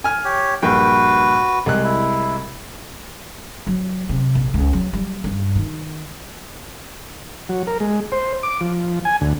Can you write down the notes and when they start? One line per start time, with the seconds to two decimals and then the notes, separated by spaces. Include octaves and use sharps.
0.04 G#5 F6
0.25 G4 C#5
0.62 A#1 G2 F#4 B4 G5
1.66 C2 G#3 F#6
1.83 E4
3.67 F#3
4.09 C3
4.35 A#1
4.54 C#2
4.73 F#3
4.93 G3
5.24 G2
5.56 D#3
7.49 F#3
7.67 A#4
7.80 G#3
8.12 C5
8.43 D6
8.61 F3
9.05 G#5
9.21 D2